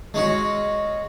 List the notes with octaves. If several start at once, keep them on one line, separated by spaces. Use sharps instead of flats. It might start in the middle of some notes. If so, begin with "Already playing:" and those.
G#3 C#4 F#4